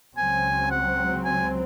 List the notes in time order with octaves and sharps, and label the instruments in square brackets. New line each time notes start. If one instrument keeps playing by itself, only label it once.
[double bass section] C#2 C#3 F#3 C4 [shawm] G#5
[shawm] F#5
G#5